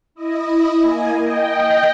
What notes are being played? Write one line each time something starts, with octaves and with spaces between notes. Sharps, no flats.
E4 D#5
A#3 G#5
D#5 G5